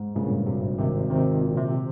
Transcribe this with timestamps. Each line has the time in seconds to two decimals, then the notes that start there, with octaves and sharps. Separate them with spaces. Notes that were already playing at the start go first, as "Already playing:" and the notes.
Already playing: G#2
0.15 G2 A#2 C#3
0.47 G#1 C3
0.78 G#1 C3 D#3
1.10 C3 D#3 C4
1.42 A#2
1.58 C3